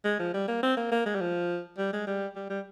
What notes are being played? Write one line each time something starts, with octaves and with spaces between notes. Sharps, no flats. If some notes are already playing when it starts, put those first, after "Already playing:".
G#3
F3
G3
A#3
C4
A#3
A#3
G#3
G3
F3
G3
G#3
G3
G3
G3